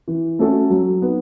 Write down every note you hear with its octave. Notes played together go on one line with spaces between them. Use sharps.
E3
A3 C#4 F#4 A4
F#3
B3 D#4